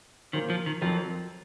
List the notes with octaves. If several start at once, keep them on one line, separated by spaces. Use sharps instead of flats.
A#2 D#3 F#3 A#3 F4 C5
F3
D#3
F2 D#3 F3 F#3 C4